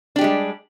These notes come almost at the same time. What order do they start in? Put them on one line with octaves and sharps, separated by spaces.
D4 G4 G#3 G3